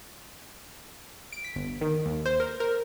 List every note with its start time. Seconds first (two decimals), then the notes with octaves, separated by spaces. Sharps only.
1.32 D7
1.44 B6
1.56 G1
1.81 D#3
2.06 D#2
2.26 C5
2.40 A#4
2.60 A#4